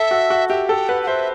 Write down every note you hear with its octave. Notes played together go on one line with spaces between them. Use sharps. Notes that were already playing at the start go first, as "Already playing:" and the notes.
Already playing: A4 E5
F#4
F#4
G4 E5
A4 G5
B4 F#5
F#5
C5 E5